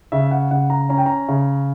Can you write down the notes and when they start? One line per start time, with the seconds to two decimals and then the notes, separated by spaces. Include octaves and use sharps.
0.12 C#3 E5
0.31 F#5
0.51 C#3 F#5
0.70 A#5
0.89 C#4 A#5
0.98 G5
1.06 A#5
1.28 C#3